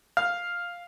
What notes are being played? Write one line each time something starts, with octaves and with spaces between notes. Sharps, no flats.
F5